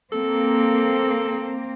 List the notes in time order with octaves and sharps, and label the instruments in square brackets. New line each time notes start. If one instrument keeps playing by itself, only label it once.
[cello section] A#3 C4 [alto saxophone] A4